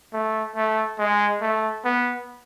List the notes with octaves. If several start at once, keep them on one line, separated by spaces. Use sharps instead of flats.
A3
A3
G#3
A3
B3